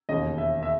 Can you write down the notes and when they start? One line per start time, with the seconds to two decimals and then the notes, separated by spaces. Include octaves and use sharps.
0.09 E1 D#2 C#3 D#5
0.38 E5
0.63 E5